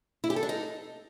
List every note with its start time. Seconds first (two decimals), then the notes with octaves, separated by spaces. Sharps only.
0.24 E4
0.30 G4
0.36 A4
0.43 D4
0.49 D#4